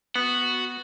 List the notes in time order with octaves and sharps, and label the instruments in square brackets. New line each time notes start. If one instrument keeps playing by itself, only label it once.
[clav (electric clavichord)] B3 [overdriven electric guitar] F#4